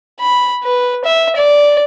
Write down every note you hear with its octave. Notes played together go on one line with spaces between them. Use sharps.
B5
B4
E5
D5